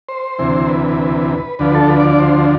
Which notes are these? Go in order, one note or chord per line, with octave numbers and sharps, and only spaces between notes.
C5
D2 C3 E3
B4
D2 D3 F3 B4
A4
B4
D5
D5
C5